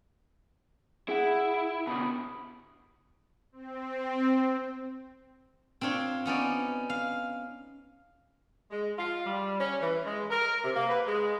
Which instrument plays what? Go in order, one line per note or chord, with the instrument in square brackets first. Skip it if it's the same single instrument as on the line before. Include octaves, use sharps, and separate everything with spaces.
[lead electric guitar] E4 [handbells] G#4 F#5
[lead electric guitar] B2 D3 [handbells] B5 D#6
[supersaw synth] C4
[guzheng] C4 D4 F4 C#5
B3 C#4 D#4 D5
F5
[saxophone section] G#3
F4
G3
C#4
E3
G#3
A#4
C3
A#3
B4
G#3